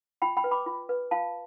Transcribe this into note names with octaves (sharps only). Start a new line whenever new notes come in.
F4 G5 B5
G5 B5
B4
B5 D6
F4
B4
F4 F5 A5